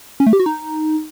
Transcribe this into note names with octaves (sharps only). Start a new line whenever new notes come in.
C#4
A3
G4
F#4
D#4